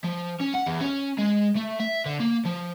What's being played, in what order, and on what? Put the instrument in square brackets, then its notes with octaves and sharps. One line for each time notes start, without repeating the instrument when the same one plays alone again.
[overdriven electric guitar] F3
C#4
F#5
E2
C#4
G#3
A3
E5
D3
A#3
F3